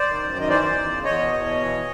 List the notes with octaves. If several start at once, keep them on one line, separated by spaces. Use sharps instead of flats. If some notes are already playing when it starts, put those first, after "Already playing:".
Already playing: C5 D5
D#3
F#2
D#3 D#5
E3 C5 D5
E2
E2
C#3
E2 C#5 D#5
B2
E2
B2
E3